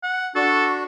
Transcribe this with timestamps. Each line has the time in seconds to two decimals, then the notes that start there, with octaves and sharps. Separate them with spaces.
0.03 F#5
0.36 D4 F#4 A4 C#6